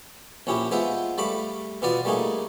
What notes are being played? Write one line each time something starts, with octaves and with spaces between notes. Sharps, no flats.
A#1 C#4 E4 G4
G#3 B3 F4 C5 E5
G3 A3 F5 B5 D6
B2 B3 F4 D5 D#6
G3 A3 A#3 D#4 G#4